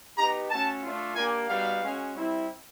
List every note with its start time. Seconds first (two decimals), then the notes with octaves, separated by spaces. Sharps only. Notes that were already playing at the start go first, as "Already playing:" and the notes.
0.17 B3 D#4 G4 A#5
0.50 A3 C#4 F#4 A5
0.83 A3 D4 F4
1.16 A#3 D4 G4 G#5
1.48 G3 B3 D#4 F#4 F5
1.82 G#3 C#4 F#4
2.14 G3 C4 E4